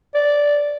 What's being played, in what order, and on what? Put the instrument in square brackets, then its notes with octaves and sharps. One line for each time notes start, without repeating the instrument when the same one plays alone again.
[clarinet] D5